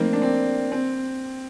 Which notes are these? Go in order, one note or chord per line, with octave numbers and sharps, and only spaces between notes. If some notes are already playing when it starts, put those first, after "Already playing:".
Already playing: F3 A3 A#3 C4 D#4
D4
C4
C4